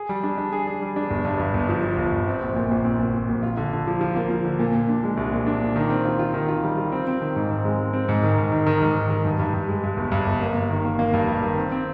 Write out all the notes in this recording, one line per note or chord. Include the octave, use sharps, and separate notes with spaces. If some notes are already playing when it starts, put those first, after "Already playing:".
Already playing: G#4
G3
D4
D4
G#4
G#4
G3
D4
G1
G2
G2
G1
F3
F3
G1
G1
C4
A#1
A#2
A#1
C4
A#2
A#2
A#1
F4
D3
D3
F3
F3
A#3
F3
D3
A#2
A#2
D4
G#3
C2
A#2
D4
A#2
D#3
C4
F4
F4
D#3
F4
G3
F4
C4
C4
D#3
G#2
C4
G#3
C4
C4
G#2
D#3
G#2
D#3
D#3
G#2
D#3
D#3
G2
G2
G2
G#3
G2
G1
G2
G1
A#3
G1
D#3
A#3
A#3
G2
G2
D#3
C4
C4